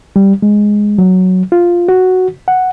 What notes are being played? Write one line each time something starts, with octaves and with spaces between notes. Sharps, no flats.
G3
G#3
F#3
F4
F#4
F#5